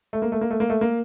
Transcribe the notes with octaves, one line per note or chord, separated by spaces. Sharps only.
A3
A#3
A3
A#3
A3
A#3
A3
A#3